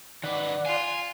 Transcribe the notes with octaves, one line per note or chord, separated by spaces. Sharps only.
D#3 B4 D5 F#5
F4 G#5